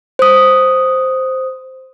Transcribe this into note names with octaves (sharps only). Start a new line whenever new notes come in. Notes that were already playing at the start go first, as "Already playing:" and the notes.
C5 D#6